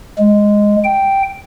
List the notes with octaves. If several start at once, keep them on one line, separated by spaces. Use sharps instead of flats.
G#3
G5